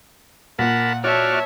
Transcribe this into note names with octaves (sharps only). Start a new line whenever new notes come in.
A#2 A#4 F#5 A5 B5
F#4 C#5 D5 E5 A5 F6